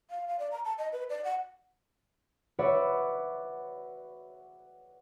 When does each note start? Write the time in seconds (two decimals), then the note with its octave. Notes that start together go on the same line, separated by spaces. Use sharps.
0.10 F5
0.28 F5
0.39 D5
0.51 A#5
0.65 A5
0.78 D#5
0.93 B4
1.10 D5
1.24 F#5
2.59 F#4 B4 C#5 D5 E5 F#5